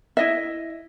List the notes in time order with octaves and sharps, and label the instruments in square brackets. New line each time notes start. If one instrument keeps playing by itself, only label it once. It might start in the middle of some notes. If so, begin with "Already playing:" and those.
[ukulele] E4 D#5 E5